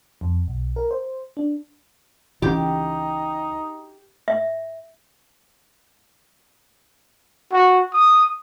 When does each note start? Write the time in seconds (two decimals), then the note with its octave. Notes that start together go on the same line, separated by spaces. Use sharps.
0.21 F2
0.48 B1
0.76 A#4
0.91 C5
1.37 D4
2.42 C#2 C#3 E3 D#4 G4
4.28 E5
7.52 F#4
7.93 D#6